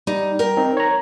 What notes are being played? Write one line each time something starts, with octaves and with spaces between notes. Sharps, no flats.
G3 D#4
A#4 G5
C4 D#4
C#5 A#5